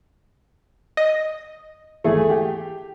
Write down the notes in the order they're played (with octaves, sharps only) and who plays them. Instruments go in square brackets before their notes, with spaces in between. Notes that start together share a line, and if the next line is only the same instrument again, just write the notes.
[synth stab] D#5
[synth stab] G#1 E2 [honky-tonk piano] A3 E4 G#4
[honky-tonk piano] G4